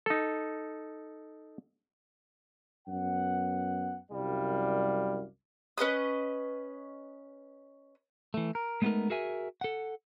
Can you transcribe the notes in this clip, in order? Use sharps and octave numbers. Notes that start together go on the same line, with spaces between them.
D#4 A4
F#2 B3 F#5
C2 F#2 G3 D5 F5
C#4 B4 D#5 D#6
E3 A3
A#4
G#3 A3 B3 C#4 D#4 A#4
F#4 G#4 A#4 E5 G#5
A4 F#5